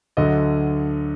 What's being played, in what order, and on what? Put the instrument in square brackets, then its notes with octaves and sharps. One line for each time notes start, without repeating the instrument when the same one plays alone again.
[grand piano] D2 D3 F#3 D#5